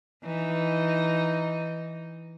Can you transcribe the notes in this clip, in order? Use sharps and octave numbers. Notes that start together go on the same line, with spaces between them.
E3 D#4